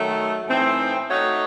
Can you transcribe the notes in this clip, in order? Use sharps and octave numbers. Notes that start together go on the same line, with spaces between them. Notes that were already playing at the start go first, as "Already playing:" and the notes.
Already playing: D#3 F#3 A3
A2 E3 C4 D#4
A3 D#4 F#4 C#5